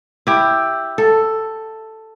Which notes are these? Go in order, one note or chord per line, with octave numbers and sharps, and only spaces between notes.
E4 G4
A4